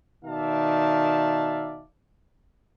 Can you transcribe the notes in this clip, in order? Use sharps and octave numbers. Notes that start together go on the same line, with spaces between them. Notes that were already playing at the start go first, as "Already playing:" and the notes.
B2 D#3 D5 E5 F5 A5